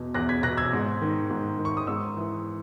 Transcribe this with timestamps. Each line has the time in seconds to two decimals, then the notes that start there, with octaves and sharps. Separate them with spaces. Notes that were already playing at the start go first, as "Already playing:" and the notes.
Already playing: E2 B2
0.14 E2 F#6 A#6
0.29 G#6 B6
0.43 B2 F#6 A#6
0.57 E6 G#6
0.73 G#2
1.01 D#3
1.30 G#2
1.58 D#3
1.65 C#6
1.77 D#6
1.87 G#2 C#6 E6
2.17 E3